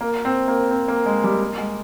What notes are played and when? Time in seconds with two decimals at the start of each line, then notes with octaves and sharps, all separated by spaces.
0.01 A#3
0.25 C4
0.48 A#3
0.70 C4
0.88 A#3
1.06 G#3
1.24 G3
1.41 A#3
1.58 G#3